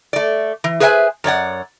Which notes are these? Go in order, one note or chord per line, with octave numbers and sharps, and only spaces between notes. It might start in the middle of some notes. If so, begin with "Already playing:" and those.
A3 D5
E3
G#4 B4 C5 E5 F#5 G#5
F#2 C#5 D5 F#5